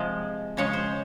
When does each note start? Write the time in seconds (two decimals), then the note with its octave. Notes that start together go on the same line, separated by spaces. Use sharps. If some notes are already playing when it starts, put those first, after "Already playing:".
Already playing: C3 F3 G#3
0.57 C#3 F3 G#3 C#5
0.73 C5